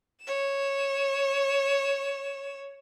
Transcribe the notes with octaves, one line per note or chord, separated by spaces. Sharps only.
C#5 E7